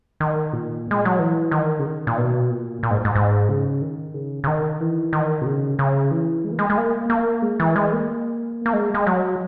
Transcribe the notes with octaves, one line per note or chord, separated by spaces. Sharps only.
D#3
A#2
G#3
F#3
E3
D#3
C#3
D#3
A#2
B2
A#2
A#2
G#2
G#2
G#2
C#3
D#3
C#3
C#3
D#3
E3
D#3
B2
C#3
C#3
E3
G#3
A#3
G#3
G#3
A#3
A#3
G#3
E3
G#3
A#3
A#3
G#3
G#3
F#3